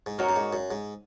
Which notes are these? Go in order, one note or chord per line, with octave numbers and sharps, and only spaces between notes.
G#2
F#2 A#3 D#4 F#4 C#5
F#2
G#2
F#2
G#2